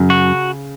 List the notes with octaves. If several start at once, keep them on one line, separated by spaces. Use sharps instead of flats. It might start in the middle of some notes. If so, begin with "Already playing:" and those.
Already playing: F#2 C#3
F#4